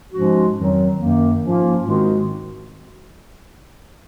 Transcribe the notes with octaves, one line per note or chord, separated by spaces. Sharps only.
G#2 F3 G#3 C#4 F#4
F2 D#3 F#3
F#2 D#3 A#3
G#2 F3 A#3 C#4 F4
G#2 D#3 G#3 C4 F#4